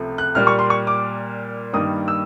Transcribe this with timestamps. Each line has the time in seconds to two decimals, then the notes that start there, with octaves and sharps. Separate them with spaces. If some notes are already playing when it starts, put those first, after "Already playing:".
Already playing: C#2 C3 F3 A3
0.18 F#6
0.35 A#2 G3 A#3 F6
0.47 C#6
0.59 C6
0.70 C#6
0.87 D6
1.73 G2 D#3 G3 A#3 D#6
2.08 E6